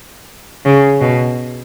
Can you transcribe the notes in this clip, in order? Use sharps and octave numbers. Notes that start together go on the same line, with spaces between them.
C#3
B2